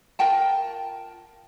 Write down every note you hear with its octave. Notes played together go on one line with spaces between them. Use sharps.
F4 A#4 G5 A5